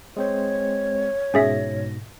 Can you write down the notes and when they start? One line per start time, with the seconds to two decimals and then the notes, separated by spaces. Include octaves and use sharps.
0.17 G#3 C4 C5 C#5
1.34 G#2 B2 C#4 G#4 E5 A#6